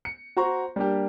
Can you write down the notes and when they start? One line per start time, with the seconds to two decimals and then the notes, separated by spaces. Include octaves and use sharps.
0.05 C#7
0.37 F#4 C5 A#5 C#6
0.76 G3 A#3 D4 G4